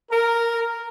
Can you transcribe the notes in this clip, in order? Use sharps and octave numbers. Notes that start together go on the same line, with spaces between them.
A#4